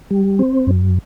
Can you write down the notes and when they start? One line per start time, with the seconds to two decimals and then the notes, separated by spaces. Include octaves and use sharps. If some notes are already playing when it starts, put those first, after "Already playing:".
0.11 G3
0.39 C4
0.67 F#2